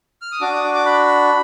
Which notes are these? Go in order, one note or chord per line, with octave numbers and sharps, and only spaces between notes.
F6
D#6
D4 F#4 D6
D#6
D6
D6
B5